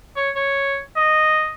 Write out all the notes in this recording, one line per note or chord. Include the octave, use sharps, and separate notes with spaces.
C#5
C#5
D#5